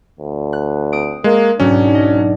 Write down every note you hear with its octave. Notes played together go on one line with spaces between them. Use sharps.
D2
F#6
C4 D#6 D7
G#3 A#3
B1 G#2 F#3 C#4 D4
D#5